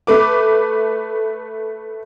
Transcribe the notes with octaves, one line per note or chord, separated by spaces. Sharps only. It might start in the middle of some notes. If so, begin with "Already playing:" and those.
A3 B4 D6